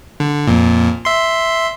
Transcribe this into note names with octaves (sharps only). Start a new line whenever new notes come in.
D3
F2 A#2
E5 C6